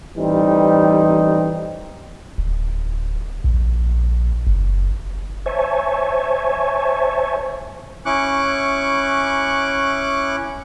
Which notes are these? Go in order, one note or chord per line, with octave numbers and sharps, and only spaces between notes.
A1 E3 G3 C4 D#4
D1
A#1
F#1
C5 C#5 E5 G#5 A5 C#6
C#4 E4 C#6 D6 F#6